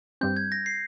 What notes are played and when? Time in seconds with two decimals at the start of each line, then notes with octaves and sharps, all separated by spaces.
0.21 G2 G3 C4 G6
0.37 G#6
0.52 A#6
0.66 C7